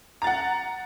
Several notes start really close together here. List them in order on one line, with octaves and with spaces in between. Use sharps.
A#5 A6 F#5